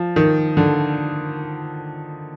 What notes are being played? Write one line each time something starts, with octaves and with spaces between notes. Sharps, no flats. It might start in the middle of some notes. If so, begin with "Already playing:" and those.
Already playing: F3
D#3
D3